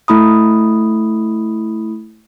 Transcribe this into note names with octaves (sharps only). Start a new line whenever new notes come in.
A3 E4 B5 D#6